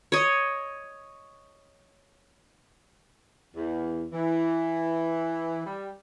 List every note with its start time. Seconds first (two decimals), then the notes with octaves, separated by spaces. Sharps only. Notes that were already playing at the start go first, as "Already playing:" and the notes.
0.12 C#5 D#5
3.55 E2
4.13 E3
5.65 G3